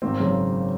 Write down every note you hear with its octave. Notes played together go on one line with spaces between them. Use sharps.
G#1 A#3 C4
F#2 C#3